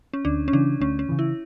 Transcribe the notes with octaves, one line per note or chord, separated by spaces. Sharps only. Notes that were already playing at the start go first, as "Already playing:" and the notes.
C#4
D2 D4
C#4
C#3 E3 D4
D2 C#4
C#4
C#3 E3
E4